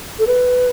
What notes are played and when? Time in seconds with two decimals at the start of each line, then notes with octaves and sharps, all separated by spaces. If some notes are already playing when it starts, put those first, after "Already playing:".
0.19 A4
0.27 B4